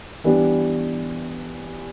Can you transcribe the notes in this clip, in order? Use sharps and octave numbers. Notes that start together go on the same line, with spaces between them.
E3 G3 B3 D4 G4